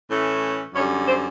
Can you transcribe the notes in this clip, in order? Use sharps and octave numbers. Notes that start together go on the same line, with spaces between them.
A2 E3 A3 C#4
F#2 D3 G3 C#4 C#5
C4 C5